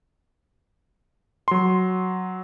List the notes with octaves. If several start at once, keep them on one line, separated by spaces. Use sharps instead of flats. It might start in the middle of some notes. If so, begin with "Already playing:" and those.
F#3 C6